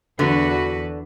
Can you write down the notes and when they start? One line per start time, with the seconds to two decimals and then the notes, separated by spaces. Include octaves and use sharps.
0.19 E2 D3 F#4 B4